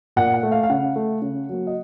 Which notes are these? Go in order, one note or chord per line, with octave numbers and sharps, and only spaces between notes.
A#2 F#5
F#5
A3
F5
F5
C#3 F#5
A3
C#3
F#3 A#3
D#5